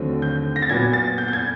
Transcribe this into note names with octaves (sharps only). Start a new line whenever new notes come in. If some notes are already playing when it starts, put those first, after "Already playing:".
Already playing: D#2 D3 F#3 A3 C4
G6
A#6
A6
A#2 F#3 B3 G#6
A6
G6
G6
G#6